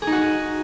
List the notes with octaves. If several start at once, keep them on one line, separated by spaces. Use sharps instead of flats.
G#4
D#4
F#4